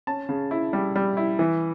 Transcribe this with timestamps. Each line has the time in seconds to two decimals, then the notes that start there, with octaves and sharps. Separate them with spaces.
0.07 C#4 A5
0.29 C#3
0.51 E4
0.73 G3
0.96 G3
1.17 E4
1.39 E3